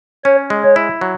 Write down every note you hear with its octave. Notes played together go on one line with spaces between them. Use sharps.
C#4 C#5
G#3
C#5
E4
F#3